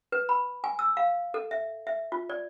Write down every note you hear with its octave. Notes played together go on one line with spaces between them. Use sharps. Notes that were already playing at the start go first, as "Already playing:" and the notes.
B4
B5
G#5
E6
F5
A4
E5
E5
F4
D5